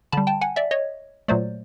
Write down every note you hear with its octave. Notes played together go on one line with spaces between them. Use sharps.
D3 G3 A5 B5
G5 A5
F#5 G#5
D5 E5
C#5 D#5
A#2 F#3 A3 C5 D5